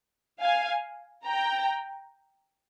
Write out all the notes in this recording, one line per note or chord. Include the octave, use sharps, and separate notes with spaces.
F5 G#5
G5 A#5